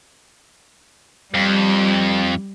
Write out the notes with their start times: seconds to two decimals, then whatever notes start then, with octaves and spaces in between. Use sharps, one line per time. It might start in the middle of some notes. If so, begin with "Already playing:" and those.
1.34 F2 G3